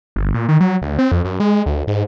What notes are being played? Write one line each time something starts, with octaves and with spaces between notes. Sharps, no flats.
G1
A#2
D#3
F#3
D2
C4
F2
F#2
G#3
D2
G#2